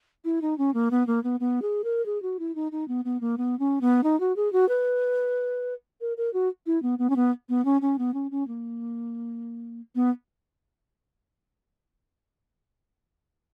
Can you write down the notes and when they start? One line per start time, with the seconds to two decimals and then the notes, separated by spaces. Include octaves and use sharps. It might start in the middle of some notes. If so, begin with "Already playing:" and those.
0.25 E4
0.42 D#4
0.58 C#4
0.74 A#3
0.91 B3
1.07 A#3
1.23 B3
1.40 B3
1.62 G#4
1.84 A#4
2.06 G#4
2.22 F#4
2.39 E4
2.55 D#4
2.72 D#4
2.88 B3
3.05 B3
3.21 A#3
3.37 B3
3.59 C#4
3.81 B3
4.03 D#4
4.20 F#4
4.36 G#4
4.52 F#4
4.69 B4
6.01 A#4
6.17 A#4
6.33 F#4
6.66 E4
6.82 B3
6.99 B3
7.10 C#4
7.16 B3
7.49 B3
7.65 C#4
7.81 C#4
7.98 B3
8.14 C#4
8.31 C#4
8.48 A#3
9.95 B3